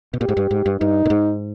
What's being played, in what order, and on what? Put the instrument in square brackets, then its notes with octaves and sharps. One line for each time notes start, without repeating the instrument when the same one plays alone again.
[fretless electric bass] B2
[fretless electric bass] A#2 [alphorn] G4
[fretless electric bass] G#2
G2
G#2
G2
[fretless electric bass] G2 [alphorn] D#4
[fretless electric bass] A#2
G#2